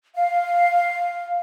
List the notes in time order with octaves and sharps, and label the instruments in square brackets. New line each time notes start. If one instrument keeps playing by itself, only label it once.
[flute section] F5